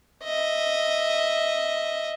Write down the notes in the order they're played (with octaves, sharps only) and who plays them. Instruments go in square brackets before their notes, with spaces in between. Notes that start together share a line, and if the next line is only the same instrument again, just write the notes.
[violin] D#5 E5